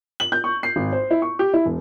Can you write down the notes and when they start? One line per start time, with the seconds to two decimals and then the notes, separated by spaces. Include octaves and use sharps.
0.20 F#7
0.32 G6
0.44 C#6
0.63 C7
0.76 G#1
0.93 C5
1.11 E4
1.22 C#6
1.39 G4
1.54 E4
1.65 E1